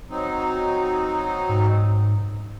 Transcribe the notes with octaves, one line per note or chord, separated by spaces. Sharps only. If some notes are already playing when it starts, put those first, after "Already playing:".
F#3 C4 D#4
G#2